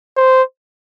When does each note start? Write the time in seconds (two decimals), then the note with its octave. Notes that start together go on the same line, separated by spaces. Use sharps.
0.17 C5